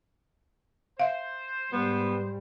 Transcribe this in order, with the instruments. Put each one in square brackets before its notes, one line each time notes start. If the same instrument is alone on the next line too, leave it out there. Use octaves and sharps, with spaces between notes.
[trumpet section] C5 [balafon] E5 F5
[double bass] G#2 G3 [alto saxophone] B3